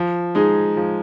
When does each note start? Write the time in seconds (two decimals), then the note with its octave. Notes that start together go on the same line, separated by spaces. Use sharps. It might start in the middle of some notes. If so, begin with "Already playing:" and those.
Already playing: F3
0.35 G#3 D#4 G#4
0.77 F3